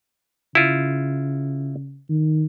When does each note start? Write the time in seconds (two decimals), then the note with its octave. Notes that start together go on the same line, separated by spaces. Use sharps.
0.55 C#3 E4 F4
2.09 D#3